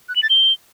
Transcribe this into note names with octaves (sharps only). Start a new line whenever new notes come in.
F#6
F#7
A6
G7